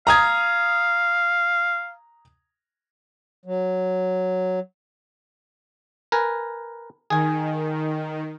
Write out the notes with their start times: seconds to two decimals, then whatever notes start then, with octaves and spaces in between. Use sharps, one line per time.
0.07 F5 A#5 D#6 G#6
3.46 F#3
6.12 A#4 B4 G#5
7.10 D#3 G#4 G#5